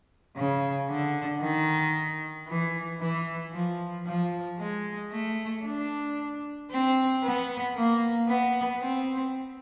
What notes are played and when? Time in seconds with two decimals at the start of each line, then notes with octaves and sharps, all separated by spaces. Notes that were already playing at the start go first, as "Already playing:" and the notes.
0.37 C#3
0.90 D3
1.41 D#3
2.48 E3
3.00 E3
3.53 F3
4.06 F3
4.59 G#3
5.11 A3
5.64 D4
6.71 C4
7.23 B3
7.75 A#3
8.29 B3
8.81 C4